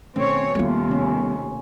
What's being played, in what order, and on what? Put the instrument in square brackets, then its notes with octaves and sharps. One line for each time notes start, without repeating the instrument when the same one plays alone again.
[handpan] B2 A3 C#4 [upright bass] D#3 [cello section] C4 C#5
[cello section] D#2 [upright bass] G3 B3 [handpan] A3 F4
[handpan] C3 C#4